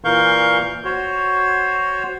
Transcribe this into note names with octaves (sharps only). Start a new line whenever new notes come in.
A#2 E3 A#4 F5 C#6 G6
F#4 C5 C#5